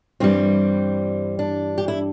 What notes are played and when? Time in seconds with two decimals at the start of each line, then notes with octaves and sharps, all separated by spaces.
0.20 G2 E3 G3 C4
1.39 D4
1.78 G4
1.88 E4